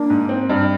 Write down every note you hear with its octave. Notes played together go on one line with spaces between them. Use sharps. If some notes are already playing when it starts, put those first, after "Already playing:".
Already playing: A#3 D4
G#2
C4
G2